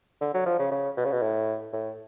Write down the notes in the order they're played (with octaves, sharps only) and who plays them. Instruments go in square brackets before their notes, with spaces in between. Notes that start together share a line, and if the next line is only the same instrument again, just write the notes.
[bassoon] D3
F#3
F3
C#3
C#3
B2
C#3
B2
A2
A2